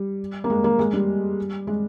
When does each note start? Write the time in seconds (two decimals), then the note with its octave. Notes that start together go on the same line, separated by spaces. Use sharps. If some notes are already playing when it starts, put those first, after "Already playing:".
Already playing: G3
0.44 A#3
0.50 G#3
0.64 A#3
0.79 G#3
0.93 G3
1.67 G#3